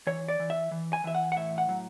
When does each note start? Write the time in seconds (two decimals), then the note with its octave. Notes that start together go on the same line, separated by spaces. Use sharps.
0.07 E3 C#5
0.29 D5
0.39 E3
0.50 E5
0.71 E3
0.93 G#5
1.04 E3 E5
1.15 F#5
1.32 F#5
1.36 A2 E5
1.58 F#5
1.69 F#3